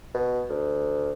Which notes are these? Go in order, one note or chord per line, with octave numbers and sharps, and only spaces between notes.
B2
D2